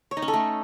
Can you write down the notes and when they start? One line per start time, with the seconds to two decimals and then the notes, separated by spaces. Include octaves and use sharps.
0.11 C#5
0.17 D#4
0.22 C#4
0.28 A4
0.34 A3